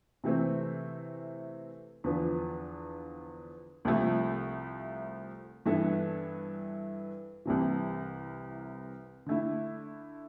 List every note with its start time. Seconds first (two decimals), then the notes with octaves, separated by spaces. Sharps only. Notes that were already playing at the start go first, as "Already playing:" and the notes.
0.24 C3 E3 A3 C4
2.04 E2 D3 F3 B3
3.85 C2 C3 F3 A3
5.66 G2 E3 B3 E4 A4
7.45 C2 C3 E3
9.26 D3 A3 E4